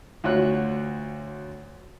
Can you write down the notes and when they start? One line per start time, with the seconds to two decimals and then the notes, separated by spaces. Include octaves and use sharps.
0.24 D2 F4 F#4 C#5 F#6